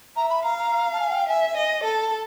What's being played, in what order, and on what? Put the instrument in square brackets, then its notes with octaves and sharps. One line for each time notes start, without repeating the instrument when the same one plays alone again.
[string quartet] E5 [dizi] A#5
[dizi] B5
[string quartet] F5 [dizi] A#5
[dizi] A#5
A5
G#5
F#5
G5
[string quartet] E5 [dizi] G#5
[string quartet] D#5
[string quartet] A4 [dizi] A5